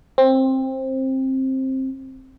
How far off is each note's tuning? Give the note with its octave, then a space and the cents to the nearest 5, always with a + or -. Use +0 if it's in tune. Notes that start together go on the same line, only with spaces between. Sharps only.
C4 +15